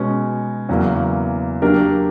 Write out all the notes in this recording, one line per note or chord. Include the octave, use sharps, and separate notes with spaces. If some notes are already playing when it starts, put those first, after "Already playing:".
Already playing: B2 G#3 C#4
E2 C#3 F#3 A#3
F#3 A#3 D4 G4 A#4